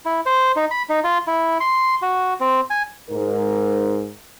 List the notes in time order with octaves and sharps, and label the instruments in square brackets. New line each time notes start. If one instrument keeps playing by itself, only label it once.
[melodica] E4
C5
D#4
B5
D#4
F4
E4
C6
F#4
C4
G#5
[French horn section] G#2 A#4